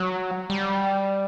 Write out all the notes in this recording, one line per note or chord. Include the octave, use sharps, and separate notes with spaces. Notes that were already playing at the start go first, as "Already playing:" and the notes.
Already playing: F#3
G3